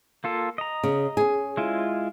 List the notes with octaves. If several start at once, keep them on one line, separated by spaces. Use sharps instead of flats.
A#3 F4 A4
D#5 A#5
C#3
C#4 G#4
G#3 E4 F4